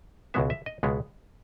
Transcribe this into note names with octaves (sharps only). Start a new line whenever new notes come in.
C#2 B2 G#3 B3 E5
E5
D#5
C#2 B2 G#3 B3